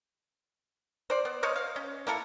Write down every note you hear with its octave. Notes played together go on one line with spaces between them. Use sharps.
C5 D5
B3
C5 C#5 D#5 F5
F5
C#4
A#3 E4 A4 A#4